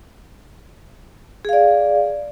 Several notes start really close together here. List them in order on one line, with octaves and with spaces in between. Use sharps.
G#4 F5 D5